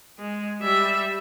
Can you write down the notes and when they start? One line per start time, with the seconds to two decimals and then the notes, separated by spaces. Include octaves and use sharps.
0.19 G#3
0.61 G3 E5